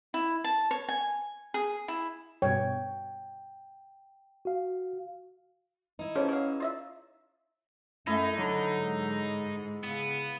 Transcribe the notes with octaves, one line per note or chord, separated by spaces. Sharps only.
E4
A5
C#5
G#5
G#4
E4
G2 B2 C#5 G5
F#4 F5
D#4 E4
F3 C#4 G#4 B4 C#5
F#3 G#4 F5
F4 D#5 E5
F#2 A3 D#4 E4
D3 F#3
G#2
C#3 B3